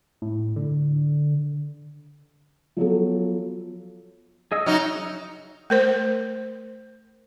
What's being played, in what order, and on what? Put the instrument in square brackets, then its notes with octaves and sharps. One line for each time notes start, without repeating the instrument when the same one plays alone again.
[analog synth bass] A2
D3
[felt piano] F3 F#3 B3 A4
[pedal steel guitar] G#4 D#5 E6
[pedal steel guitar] C#3 E5 F6 [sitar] F#3 D#4
[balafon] A3 A#4 C5